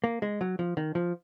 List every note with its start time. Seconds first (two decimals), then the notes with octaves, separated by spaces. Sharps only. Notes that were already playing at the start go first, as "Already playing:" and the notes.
0.04 A#3
0.22 G#3
0.41 F#3
0.59 F3
0.77 D#3
0.95 F3